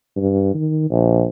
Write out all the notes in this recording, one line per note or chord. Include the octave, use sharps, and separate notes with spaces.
G2
D#3
A#1